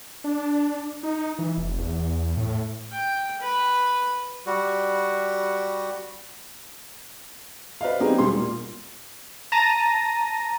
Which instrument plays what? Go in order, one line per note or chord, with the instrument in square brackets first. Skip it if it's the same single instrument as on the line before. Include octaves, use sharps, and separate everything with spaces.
[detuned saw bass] D4
D#4
E3
F1
E2
A2
[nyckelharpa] G5
B4
[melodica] G3 F#4
[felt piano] B4 D5 D#5 F5
F#3 B3 C4 D#4 G4 G#4
E1 G3 C6
A#2
[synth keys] A5 A#5 A#6 D#7